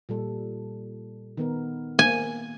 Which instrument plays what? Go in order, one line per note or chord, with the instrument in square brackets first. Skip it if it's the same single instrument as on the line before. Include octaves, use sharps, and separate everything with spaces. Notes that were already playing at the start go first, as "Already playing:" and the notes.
[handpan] A#2 G3 A4
D#3 B3 A#4
[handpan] A#3 [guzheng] G#5